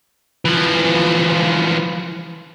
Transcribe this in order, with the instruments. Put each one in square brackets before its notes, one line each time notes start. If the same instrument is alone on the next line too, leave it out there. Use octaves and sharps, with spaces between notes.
[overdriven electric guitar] E3 F3